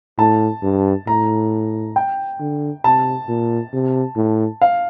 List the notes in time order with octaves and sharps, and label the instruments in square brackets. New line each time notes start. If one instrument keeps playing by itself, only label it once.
[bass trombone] A2 [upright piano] A5
[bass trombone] G2
[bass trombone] A2 [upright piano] A#5
[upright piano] G5
[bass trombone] D3
[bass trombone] C3 [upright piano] A5
[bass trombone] A#2
C3
A2
[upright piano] F5